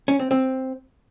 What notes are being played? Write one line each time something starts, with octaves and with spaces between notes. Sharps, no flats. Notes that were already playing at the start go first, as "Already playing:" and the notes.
C#4
C4
C4